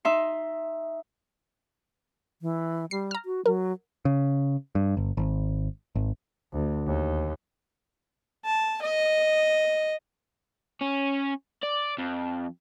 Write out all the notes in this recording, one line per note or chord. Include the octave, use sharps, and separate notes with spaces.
D#4 E5 C6
E3
G3 C7
A#5 F6
F#4
F#3 A#4
C#3
G2
G1
G#1
G#1
D2
D#2
A5
D#5
C#4
D5
F2